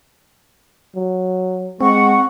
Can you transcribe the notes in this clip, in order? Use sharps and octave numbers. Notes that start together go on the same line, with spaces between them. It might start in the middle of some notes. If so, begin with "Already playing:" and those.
F#3
G#3 C4 F#5 C#6